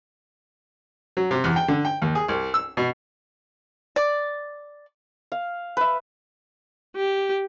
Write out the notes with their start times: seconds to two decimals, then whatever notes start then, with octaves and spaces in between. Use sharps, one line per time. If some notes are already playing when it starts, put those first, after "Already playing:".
1.17 F#3
1.31 C3
1.44 E2
1.56 G5
1.68 D3
1.85 G5
2.02 D#2
2.15 G#4
2.28 C2
2.54 E6
2.77 B2
3.96 D5
5.32 F5
5.77 B4 E5
6.96 G4